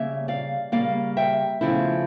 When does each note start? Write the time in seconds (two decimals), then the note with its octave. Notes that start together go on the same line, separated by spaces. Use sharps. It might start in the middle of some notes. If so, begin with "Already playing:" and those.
Already playing: C#3 G3 A#3 C#5 E5
0.28 D5 F5
0.72 C#3 G3 A#3 D5 F5
1.17 E5 G5
1.61 E2 C#3 F3 A3 E4